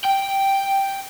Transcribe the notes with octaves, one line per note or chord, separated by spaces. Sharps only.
G5